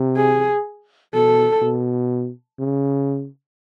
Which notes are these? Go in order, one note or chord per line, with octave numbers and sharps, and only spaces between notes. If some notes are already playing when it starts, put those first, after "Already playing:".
Already playing: C3
G#4
B2 A4
B2
C#3